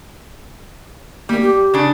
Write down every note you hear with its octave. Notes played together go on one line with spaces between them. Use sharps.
G3 A#3
G4
C#3 D4